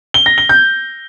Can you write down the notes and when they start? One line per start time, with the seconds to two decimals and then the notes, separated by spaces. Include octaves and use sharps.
0.14 G7
0.26 A#6
0.38 G7
0.49 G6